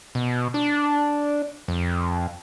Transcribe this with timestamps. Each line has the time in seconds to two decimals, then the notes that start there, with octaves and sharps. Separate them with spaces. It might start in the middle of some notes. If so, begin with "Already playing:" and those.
0.15 B2
0.54 D4
1.68 F2